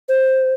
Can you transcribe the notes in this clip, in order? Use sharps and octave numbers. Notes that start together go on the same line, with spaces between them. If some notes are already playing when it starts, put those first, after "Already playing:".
C5